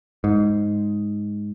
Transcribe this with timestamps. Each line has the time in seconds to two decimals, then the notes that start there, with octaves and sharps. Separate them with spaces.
0.24 G#2